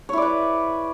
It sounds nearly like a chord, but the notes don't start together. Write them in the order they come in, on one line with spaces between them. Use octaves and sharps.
C#5 E4 D5 B4